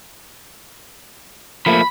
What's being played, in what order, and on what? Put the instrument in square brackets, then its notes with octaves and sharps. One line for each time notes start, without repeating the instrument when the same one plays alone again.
[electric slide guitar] F3 A3 A#3 [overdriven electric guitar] B5